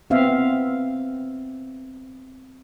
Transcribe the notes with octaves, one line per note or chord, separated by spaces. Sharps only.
B3 C4 E5 F5